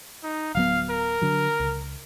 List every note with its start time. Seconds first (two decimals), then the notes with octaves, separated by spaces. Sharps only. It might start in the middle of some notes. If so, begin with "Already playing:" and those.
0.23 D#4
0.55 D1 F#3 B3 F5
0.90 A#4
1.22 D3 F#3
1.60 C#2